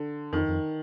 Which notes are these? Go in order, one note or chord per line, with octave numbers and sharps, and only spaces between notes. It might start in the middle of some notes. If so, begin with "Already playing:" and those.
Already playing: D3
F2 D#3
F2